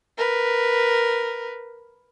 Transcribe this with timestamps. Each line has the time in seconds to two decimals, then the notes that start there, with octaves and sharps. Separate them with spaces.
0.18 A#4 B4